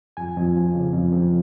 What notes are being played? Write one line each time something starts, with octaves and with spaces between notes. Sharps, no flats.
F2 G#5
F2
F3
C#3
F2
F2